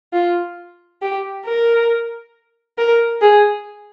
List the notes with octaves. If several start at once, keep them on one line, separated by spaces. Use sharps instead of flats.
F4
G4
A#4
A#4
G#4